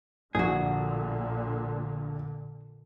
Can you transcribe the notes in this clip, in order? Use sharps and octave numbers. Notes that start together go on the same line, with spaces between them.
A#1 A#2 D3 F#4 G#4